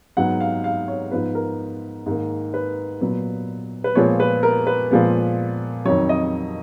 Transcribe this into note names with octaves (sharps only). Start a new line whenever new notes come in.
G#2 F#3 B3 F#5
F5
F5
C#5
G#2 F3 B3 B4
A#4
G#2 D#3 A#3
B4
A#2 F#3 B3
B4
A#2 F3 G#3 B3 C#5
B4
A#4
B4
A#2 F3 G#3 B3
F2 D#3 F#3 C#5
D#5